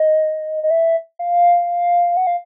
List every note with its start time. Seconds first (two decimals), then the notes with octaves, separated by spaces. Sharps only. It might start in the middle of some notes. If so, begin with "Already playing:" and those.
Already playing: D#5
0.63 D#5
0.70 E5
1.19 F5
2.17 F#5
2.27 F5